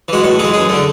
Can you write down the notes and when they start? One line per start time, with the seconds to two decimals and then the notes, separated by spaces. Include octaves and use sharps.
0.08 E3 G#3 F#4
0.24 A2 F#4
0.39 E3 G#3 G#4
0.54 F#2 G#4
0.69 D3 A3